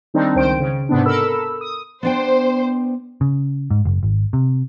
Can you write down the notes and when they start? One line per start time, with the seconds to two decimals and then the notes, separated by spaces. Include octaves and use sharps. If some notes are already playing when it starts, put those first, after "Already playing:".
0.14 D#3 G3 C4 D4 D#4
0.35 C#2 D#3 C5 G5 D7
0.59 C#3
0.89 G#2 C3 B3 D4
1.06 A4 A#4 B5 E6
1.61 D#6
2.03 B3 D4 C5 G5
3.21 C#3
3.70 G#2
3.85 F#1
4.03 G#1
4.33 C3